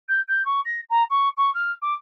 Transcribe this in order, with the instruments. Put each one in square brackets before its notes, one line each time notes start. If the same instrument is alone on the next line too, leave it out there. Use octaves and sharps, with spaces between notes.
[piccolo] G6
G6
C#6
A#6
A#5
C#6
C#6
F6
D6